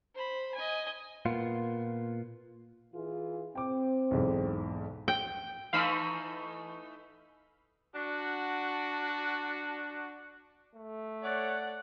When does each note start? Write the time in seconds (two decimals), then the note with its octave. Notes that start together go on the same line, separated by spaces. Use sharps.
0.15 C5 B5
0.55 D#5 G#5
1.25 A#2 B3 F4
2.94 E3 F4 G#4
3.55 C4 G5 D6
4.11 B1 E2 G#2
5.08 G5
5.73 E3 A3 D#4 F5 B5 E6
7.95 D4 F#4
10.75 A3
11.23 C#5 D5 F#5